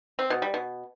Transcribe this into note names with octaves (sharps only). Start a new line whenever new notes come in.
C4
B2
G3
B2